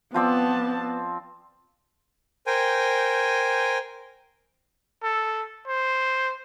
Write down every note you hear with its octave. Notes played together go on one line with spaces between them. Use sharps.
F3 B3 C4 D5 A5
A#4 C5 G5 G#5
A4
C5